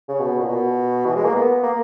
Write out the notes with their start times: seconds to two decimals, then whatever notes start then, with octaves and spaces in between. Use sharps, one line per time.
0.09 C#3
0.20 B2
0.40 A#2
0.48 B2
1.05 E3
1.16 G#3
1.25 A#3
1.35 B3
1.63 A#3